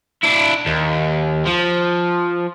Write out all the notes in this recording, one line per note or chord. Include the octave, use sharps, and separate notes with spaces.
D4 E4
D#2
F3